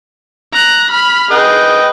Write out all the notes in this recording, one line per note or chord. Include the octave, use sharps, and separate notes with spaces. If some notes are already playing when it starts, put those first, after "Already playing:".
A#5 F#6
B5 F6
G#4 B4 D#5 G5